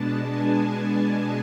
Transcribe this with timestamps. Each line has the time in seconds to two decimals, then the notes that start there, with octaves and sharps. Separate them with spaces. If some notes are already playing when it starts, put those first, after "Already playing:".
Already playing: B2 G#3 B3 D4 A5
0.26 G#5